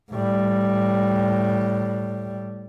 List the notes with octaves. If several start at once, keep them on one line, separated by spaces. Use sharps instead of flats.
A2 G3